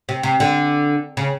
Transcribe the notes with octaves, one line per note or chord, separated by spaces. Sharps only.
C3
C3
D3
C#3